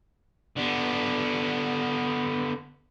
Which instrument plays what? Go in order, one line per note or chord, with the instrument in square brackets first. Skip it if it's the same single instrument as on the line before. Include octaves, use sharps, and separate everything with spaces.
[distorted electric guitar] D3 B3